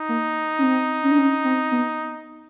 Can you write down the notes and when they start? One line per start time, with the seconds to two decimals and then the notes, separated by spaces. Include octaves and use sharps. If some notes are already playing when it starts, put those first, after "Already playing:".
Already playing: D#4
0.09 A#3
0.59 C#4
0.63 C4
1.03 C#4
1.11 D4
1.18 C#4
1.44 C4
1.71 B3